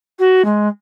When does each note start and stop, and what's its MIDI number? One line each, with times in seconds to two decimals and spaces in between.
0.19 0.44 66
0.45 0.68 56